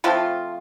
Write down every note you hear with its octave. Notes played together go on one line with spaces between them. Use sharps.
F3 A3 C4 F4